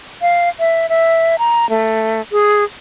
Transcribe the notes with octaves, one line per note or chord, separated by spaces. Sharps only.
F5
E5
E5
A#5
A3
G#4